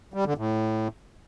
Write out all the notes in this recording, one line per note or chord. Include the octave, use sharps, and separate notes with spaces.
G3
D3
A2